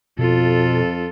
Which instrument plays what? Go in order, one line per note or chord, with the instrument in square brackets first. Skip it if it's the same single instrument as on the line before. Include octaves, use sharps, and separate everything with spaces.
[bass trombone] F2 [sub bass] B2 [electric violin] F4 A4